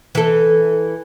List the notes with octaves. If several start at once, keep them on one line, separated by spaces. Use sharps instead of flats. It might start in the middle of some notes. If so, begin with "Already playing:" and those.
E3 A4